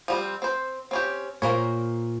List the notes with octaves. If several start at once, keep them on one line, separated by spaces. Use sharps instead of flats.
F3 G3 C4
C4 C5
C4 C#4 G4
A#2 A#3 A#4 C5 C#5